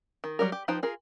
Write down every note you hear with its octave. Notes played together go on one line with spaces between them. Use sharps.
D#3
F#3 G3 A#4
G4
F3 D#4 B4 C5 G5
F4 G#4 A#4